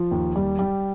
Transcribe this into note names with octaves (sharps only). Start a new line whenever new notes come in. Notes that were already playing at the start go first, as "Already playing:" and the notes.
Already playing: F3
D#2
G3
G3